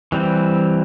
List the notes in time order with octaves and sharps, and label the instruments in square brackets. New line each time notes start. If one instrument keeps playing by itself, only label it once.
[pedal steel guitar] E3 G3 C4